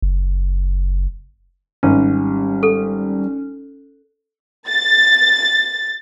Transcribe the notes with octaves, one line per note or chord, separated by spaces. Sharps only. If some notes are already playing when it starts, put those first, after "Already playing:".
F#1
G#1 G3 C#4
A4
A6